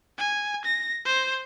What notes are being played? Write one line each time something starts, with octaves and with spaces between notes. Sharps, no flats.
G#5
A#6
C5